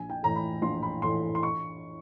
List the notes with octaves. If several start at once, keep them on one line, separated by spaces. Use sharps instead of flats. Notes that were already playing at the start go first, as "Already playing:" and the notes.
Already playing: A#1 G#5
G5
A2 E3 A3 A#5
B5
A#1 C6
B5
A2 E3 A3 C6
C6
C#6